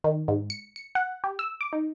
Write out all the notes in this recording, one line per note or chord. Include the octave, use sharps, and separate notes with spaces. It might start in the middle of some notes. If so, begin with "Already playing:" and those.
D#3
G#2
C#7
C#7
F#5
G4
E6
D6
D#4